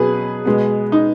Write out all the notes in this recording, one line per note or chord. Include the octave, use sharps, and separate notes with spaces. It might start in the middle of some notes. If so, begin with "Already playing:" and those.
Already playing: B2 F#3 B3 G#4 B4
B2 G#3 B3
D#4